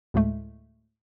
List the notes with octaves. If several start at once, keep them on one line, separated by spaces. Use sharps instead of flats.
D2 A2 G#3 A3